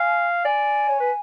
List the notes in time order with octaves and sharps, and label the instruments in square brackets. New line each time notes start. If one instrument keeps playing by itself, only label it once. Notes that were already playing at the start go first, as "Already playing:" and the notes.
Already playing: [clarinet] F5 [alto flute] G#5
[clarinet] D5 [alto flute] G#5
[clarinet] C#5
B4